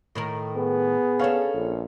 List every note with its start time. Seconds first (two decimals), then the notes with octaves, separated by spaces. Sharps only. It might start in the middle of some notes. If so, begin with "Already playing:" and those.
0.15 A2 D#3 A#4
0.57 B3 G#4
1.19 C#4 D4 A4 C#5 F5
1.54 A#1